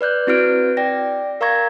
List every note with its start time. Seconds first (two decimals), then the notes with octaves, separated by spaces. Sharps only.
0.01 B4 D5 F#6 G6
0.27 C4 E4 F#4 B4 F6 D7
0.77 D5 G5 A#6
1.41 A#4 F5 A#5 C#6 G#6 A#6